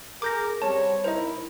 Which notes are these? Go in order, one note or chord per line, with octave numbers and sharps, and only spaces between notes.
G#4 A#4 D6 G6 A#6
G3 C4 C#5 A5
D#4 E4 A#4 C5 D#5